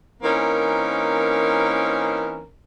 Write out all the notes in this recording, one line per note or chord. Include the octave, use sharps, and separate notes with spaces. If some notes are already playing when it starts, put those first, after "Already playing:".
E3 A#3 C4 C#4 D#4 A#4